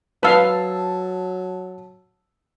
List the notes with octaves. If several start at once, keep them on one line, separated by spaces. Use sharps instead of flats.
F#3 B4 F5 A5 E6